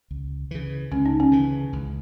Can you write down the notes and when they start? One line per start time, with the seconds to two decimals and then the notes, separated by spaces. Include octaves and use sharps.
0.11 C#2
0.51 C#3 E3
0.91 C#2 C#4
1.06 D#4
1.20 C#4
1.32 C#3 E3
1.73 C#2